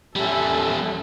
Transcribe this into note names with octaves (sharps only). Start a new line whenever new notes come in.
G3 C#4 A4 E5